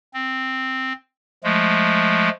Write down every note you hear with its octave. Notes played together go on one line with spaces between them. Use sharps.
C4
F3 G#3 A3